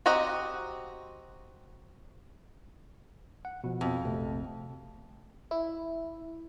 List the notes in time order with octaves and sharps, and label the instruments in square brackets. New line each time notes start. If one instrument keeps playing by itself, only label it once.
[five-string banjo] C4 F#4 G4 D#5 A#5
[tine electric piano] F#5
B2 F3
[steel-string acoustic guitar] F2
[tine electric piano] A#1 C3 A3
[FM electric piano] E4